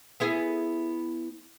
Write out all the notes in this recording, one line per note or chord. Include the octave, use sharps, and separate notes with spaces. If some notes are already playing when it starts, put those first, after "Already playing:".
B3 E4 G#4